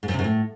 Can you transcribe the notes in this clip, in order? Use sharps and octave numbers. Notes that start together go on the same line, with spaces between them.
G#2
F#2
C3
F#2
A2